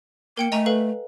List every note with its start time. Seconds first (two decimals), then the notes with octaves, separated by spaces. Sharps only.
0.37 A#3 A#4 G5 C#7
0.52 A3 D#5 G#5 A#5
0.66 A4 B4 F5